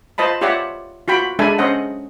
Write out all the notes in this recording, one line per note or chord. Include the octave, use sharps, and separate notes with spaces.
F4 C5 D#5 A5 B5
F4 G4 C#5 D5 E5 F#5
F4 F#4 G5 B5
G#3 D4 A4 E5 G#5 B5
C#4 C5 D#5 F#5